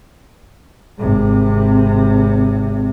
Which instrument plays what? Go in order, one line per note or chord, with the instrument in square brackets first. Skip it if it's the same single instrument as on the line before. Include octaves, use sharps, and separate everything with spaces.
[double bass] G#1 C3